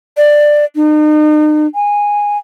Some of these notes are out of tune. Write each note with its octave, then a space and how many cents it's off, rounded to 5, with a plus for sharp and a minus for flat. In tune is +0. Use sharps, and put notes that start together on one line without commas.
D5 +10
D#4 -40
G#5 -10